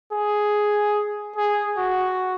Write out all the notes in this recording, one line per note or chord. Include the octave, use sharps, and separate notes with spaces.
G#4
G#4
F#4